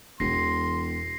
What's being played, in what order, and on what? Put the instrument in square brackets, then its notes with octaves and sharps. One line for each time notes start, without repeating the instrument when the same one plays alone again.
[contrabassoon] E1 [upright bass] E2 B2 [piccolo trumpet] C6 [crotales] A#6 C7